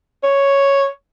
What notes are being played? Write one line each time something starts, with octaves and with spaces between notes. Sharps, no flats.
C#5